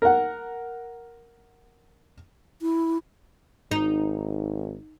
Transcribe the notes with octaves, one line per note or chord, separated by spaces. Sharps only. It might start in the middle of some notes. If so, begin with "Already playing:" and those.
A#4 F#5
E4
G#1 D#4